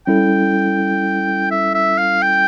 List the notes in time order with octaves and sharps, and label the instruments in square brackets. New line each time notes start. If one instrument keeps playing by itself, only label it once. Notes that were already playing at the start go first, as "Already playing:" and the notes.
[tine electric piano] G3 C#4 E4 A4 [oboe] G5
[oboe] E5
E5
F5
G5